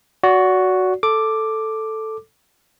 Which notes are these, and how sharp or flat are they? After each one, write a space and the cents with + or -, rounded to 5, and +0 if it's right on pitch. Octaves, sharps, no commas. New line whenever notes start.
F#4 +0 D5 -35
A4 +0 D6 +5